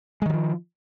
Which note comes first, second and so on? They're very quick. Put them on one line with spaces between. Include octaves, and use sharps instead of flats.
G#3 D#3 F#3 F3